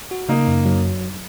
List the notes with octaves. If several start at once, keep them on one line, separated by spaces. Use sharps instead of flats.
F#4
C#3 A#3 D#4
F#2
F#3